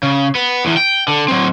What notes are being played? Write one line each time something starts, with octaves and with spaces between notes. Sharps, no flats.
C#3
B3
E2 E3
G5
D3
F#3 C4